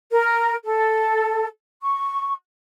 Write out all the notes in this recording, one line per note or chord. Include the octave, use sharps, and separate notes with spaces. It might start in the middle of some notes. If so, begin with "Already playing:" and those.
A#4
A4
C#6